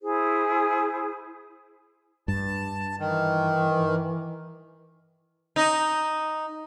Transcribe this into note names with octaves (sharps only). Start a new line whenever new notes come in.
E4 G#4 C5
G2 A5
D#3 E3
D#4